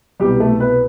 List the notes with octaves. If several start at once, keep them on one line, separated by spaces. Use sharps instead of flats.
C2 B2 F#3 G3 B3 G4
A3 A4
B3 B4